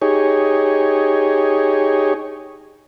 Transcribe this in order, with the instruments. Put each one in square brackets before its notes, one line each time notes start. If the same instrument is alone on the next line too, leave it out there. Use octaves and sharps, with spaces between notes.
[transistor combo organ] D#4 G4 G#4 C#5